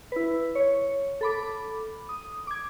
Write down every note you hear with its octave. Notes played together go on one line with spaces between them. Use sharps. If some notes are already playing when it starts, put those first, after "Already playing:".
E4 B4
C#5
A4 B5 D6
D#6
D6 G#6